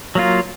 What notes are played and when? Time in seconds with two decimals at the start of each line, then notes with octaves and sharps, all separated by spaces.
0.15 F#3 A#3 F4